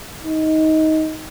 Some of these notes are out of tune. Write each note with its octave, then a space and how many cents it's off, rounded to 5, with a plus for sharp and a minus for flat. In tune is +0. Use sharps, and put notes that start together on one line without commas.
D#4 +15